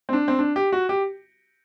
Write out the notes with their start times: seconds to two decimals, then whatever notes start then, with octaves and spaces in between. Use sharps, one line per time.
0.09 C4
0.13 D4
0.28 C4
0.39 D4
0.56 G4
0.72 F#4
0.89 G4